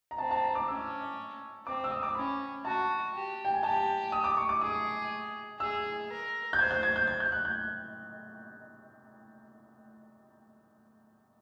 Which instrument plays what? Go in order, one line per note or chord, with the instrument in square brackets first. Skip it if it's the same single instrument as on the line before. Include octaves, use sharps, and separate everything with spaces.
[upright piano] A#5
[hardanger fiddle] C4 [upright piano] A5
[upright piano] A5
A#5
D6
[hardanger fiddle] C#4 [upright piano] E6
[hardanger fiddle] C4 [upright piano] D6
[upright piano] E6
D#6
D6
[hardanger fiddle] C#4 [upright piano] B5
[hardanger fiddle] F#4 [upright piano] A5
[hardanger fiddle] G4
[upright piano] G5
G#5
[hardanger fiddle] G4 [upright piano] A5
[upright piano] D#6
D6
C#6
D6
[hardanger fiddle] G#4 [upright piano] D#6
[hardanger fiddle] G#4 [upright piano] E6
[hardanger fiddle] A#4
[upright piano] G6
[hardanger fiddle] C5 [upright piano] G#6
[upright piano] G6
G#6
G6
G#6
G6
F#6
G6